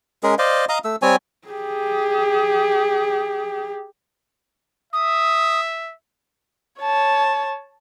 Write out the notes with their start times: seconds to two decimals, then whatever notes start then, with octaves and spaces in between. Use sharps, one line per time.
0.23 G#3 C#4 G#4 A#4
0.38 C5 D5 D#5 F5
0.69 D#5 F5 A#5 D#6
0.84 A3 E6
1.02 G3 C4 C#5 G#5
1.48 G4 G#4
4.93 E5 D#6
6.81 C#5 A5